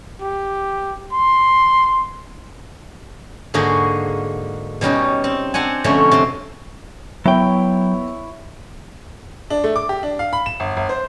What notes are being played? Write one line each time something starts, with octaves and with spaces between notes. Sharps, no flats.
G4
C6
G#2 D3 A#3 D#4 F#4 G#4
B2 G3 C#4 D#4
C4
C4 D4 F#5 G#5
F2 B2 D3 A3 C#4 C#5
C3 C6
F#3 B3 E4 C#5 G5
D4
A3
D6
G4
D4
F5
B5
E7
G1
G1
C5